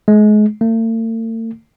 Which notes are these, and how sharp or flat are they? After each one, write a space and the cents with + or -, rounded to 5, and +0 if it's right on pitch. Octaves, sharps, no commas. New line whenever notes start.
G#3 +30
A3 +45